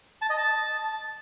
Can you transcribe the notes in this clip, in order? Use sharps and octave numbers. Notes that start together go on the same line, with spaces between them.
A5
D#5
A5